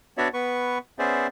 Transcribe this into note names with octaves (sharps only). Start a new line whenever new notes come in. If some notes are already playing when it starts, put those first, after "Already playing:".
B3 D4 F#4 C#5 D5 E5
B3 B4 C#6
B3 C#4 G#4 C5 D5 E5